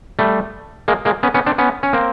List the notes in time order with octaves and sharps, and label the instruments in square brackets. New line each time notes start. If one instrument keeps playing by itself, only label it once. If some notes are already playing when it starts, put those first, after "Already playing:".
[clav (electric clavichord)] G3 A3
G#3 A#3
G#3 A#3
B3 C#4
B3 C#4
C4 D4
B3 C#4
C#4
A#3 C4